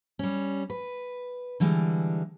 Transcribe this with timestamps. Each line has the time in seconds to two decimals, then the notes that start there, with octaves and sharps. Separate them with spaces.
0.19 G3 C#4
0.70 B4
1.60 D3 E3 G3 G#3